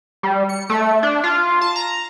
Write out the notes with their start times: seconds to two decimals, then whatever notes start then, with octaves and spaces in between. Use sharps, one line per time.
0.23 G3
0.49 C#7
0.70 A3
1.03 D4
1.23 F4
1.61 A5
1.76 A#5